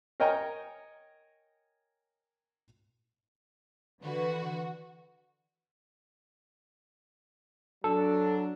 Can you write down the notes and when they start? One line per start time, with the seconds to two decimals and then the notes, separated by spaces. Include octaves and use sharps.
0.20 A#4 C#5 D#5 G5 G#5 A#5
4.03 D3 E3 F#4 B4
7.84 F#3 D4 A4